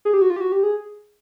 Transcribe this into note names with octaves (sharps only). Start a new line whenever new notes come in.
G#4
G4
F#4
F4
G4
F#4
G4
G#4